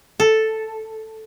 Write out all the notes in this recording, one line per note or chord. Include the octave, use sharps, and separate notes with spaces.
A4